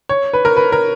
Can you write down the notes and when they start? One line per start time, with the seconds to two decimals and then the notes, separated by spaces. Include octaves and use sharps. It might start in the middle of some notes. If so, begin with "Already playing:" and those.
0.09 C#5
0.33 B4
0.45 A#4
0.57 B4
0.72 A#4